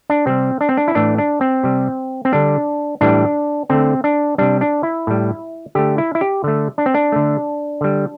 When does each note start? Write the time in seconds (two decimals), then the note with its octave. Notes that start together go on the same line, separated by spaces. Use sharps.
0.10 D4
0.26 C3 G3 C4
0.61 D4
0.69 C4
0.77 D4
0.88 E4
0.95 A2 E3 A3 D4
1.18 D4
1.41 C4
1.64 C3 G3
2.25 C4
2.32 D3 G3 D4
3.01 A2 E3 G3 D4
3.70 D3 A3 C4
4.04 D4
4.38 C3 G3 D4
4.61 D4
4.83 E4
5.07 A2 G3
5.75 D3 A3 G4
5.98 E4
6.15 E4
6.21 G4
6.44 D3 A3
6.78 D4
6.86 C4
6.94 D4
7.12 D3 A3
7.81 D3 G3